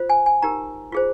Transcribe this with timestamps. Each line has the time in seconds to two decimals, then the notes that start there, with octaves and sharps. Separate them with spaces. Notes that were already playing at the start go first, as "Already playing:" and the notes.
Already playing: F4 C5
0.09 G#5
0.26 G#5
0.42 D#4 G4 A#4 A#5
0.92 F4 G#4 C5